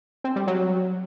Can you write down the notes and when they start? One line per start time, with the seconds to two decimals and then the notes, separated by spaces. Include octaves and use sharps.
0.24 C4
0.36 G3
0.47 F#3